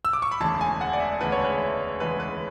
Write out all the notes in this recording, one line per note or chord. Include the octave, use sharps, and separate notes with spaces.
E6
D6
C#6
B5
E1 D2 C#3 E3 G#3 A5
G#5
F#5
D5
E5
E1 D2 C#3 E3 G#3 B4
C#5
B4
E1 D2 C#3 E3 G#3 B4
B4